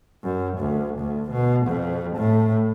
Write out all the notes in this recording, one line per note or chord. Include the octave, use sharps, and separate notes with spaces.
F#2
D2
D2
B2
F2
A2